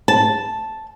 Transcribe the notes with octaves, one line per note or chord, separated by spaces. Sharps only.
A5